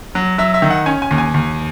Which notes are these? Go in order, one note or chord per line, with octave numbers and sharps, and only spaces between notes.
F#3
F#3 E5
E5
D#3
F#5
C#4 G#5
G#5
D#2
G#5
D#2